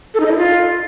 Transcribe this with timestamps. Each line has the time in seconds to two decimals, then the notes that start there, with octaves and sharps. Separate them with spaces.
0.14 A4
0.20 D#4
0.26 D#5
0.31 E4
0.37 F4